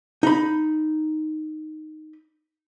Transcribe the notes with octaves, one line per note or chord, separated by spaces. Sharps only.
D#4 B5